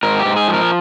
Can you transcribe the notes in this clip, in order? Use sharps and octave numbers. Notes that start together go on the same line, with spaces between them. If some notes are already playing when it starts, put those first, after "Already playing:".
G#2 A#4
G4
G#2
G#4
F3
A#4